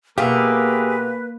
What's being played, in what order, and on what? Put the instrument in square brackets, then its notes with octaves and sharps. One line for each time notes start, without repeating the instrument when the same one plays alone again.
[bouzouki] B2 F4 [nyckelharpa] A#3 [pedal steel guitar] G4 G#4 E5 [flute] B4